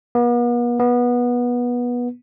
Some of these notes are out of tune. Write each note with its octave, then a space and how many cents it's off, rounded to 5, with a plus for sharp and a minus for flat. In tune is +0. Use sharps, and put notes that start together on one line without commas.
B3 -45
B3 -20